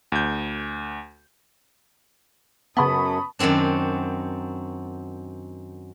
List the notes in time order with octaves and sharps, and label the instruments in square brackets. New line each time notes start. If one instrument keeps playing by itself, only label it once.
[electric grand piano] D2 G6
[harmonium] F#2 [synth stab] C#3 B3 [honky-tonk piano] A5 B5 C#6 [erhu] D#6
[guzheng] F#2 D#3 F#3 C4 D4